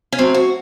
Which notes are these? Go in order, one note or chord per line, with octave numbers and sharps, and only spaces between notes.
C#4
A2 F#3 C4
F#4